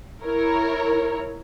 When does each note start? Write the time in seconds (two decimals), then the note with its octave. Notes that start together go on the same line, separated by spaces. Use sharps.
0.23 E4 A#4 C#5